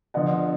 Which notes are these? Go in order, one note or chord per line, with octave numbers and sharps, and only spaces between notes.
D3 F3 B3 D#5 F#5